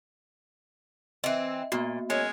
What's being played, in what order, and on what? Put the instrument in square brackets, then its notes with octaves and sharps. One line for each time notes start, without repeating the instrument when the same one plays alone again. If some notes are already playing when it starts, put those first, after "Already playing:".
[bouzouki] E3 C4 [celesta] D#5 E5
[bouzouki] A#2 [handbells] A#3 B3 F#4
[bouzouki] D#3 [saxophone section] G#3 C#4 C#5